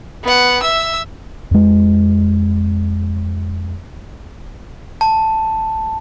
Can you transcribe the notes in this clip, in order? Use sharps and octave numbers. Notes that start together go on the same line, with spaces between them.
B3 F#5
E5 E6
F2 G#3
A5